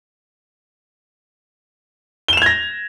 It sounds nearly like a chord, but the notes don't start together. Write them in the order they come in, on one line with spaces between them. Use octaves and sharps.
G7 E7 F7 G#6 A#6